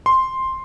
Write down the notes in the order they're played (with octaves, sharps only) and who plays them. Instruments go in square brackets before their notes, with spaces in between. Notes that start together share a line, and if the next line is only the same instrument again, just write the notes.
[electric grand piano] C6